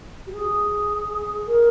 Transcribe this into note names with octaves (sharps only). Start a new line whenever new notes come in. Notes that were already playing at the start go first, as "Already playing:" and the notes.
G4
G#4
A#4